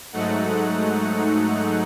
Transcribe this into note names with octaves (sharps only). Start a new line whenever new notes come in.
G#2 F#3 A3 D#4 F#5